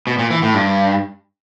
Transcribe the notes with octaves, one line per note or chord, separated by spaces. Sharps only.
B2
A#2
E3
A2
G2